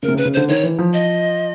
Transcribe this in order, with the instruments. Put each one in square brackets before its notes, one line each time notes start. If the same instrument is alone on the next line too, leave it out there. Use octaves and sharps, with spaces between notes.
[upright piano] C#3 [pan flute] A#4
[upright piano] C3
C#3
[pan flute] B4
[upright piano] C#3
[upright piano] D3 [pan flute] C5
[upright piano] D#3 [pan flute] C#5
[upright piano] E3
F3
[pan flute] D#5